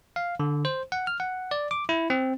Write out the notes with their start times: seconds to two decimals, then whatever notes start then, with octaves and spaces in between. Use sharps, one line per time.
0.16 F5
0.40 D3
0.65 C5
0.92 F#5
1.07 F6
1.20 F#5
1.51 D5
1.71 D6
1.89 E4
2.10 C4